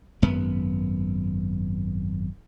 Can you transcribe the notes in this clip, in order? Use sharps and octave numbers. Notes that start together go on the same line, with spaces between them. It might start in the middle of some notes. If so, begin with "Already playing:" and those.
G#1 F#2 B3